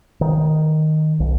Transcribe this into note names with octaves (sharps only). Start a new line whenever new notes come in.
D#3
B1